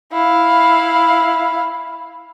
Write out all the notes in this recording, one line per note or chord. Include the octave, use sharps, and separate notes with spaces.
E4 F5